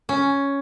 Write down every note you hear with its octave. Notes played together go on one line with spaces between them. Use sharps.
C#4